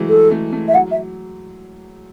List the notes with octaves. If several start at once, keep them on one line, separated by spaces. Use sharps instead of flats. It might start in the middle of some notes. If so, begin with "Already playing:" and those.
Already playing: E3 F#3 G#3 A3
A4
A3
A3
E5
F#3 F#5
E5